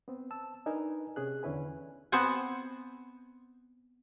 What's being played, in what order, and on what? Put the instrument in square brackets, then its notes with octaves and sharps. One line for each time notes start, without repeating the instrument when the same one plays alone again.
[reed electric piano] B3 C4
A5 E6
D4 D#4 A#4 B4 G#5
C3 C#4 G#4 F#6
E2 D3 C#4 E4 B4 G#5
[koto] B3 C4 C5 F#5 G#5